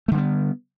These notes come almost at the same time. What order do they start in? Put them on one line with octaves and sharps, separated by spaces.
A3 D3 G3 B3